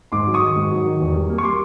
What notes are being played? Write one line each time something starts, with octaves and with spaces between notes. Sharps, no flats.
G#2 C6 D6
F#3
C#6 D#6
D#3
G#2
F#3
D#3
E2
G3
A#3
C#6
G3 C6 D6